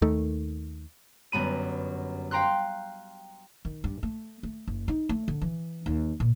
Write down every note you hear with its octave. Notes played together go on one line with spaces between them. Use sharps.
D#2 D#3 A3
G1 F#2 B3 B5 D#7
F5 G5 A#5 C6 F#6
D#3
G2
A3
A3
F#1
D#4
A3
D3
E3
D#2
A#2